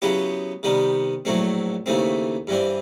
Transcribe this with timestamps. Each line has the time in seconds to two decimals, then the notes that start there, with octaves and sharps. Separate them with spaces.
0.02 C#3 F#3 B3 E4 G4
0.63 C3 D#3 G3 B3
1.25 A#1 A2 F#3 A3 C4
1.86 D#2 C#3 E3 A3 C4
2.47 G2 E3 G3 C4